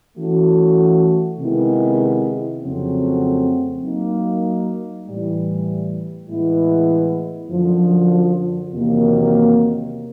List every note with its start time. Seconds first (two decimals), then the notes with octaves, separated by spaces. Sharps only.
0.17 E3 A3 C#4 F#4
1.39 C3 D#3 G#3 B3 E4
2.62 F2 C#3 F#3 A3 C4
3.83 F#3 A#3 D#4
5.06 A2 E3 G3
6.28 A2 E3 G#3 B3 E4
7.50 F#2 D3 F3
8.72 E2 C3 D#3 F#3 A#3